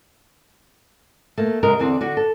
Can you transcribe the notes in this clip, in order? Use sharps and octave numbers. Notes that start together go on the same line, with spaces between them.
A3 A#3
F#2 C#3 G#3 A#4
E2 D3 C4 D5
D3 F#4
A4